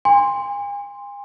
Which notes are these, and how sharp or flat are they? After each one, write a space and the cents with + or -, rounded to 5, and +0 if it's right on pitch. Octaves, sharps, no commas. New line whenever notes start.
G#5 -40 C6 +0